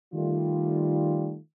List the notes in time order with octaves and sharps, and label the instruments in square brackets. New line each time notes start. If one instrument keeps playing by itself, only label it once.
[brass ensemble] D#3 G3 A3 F4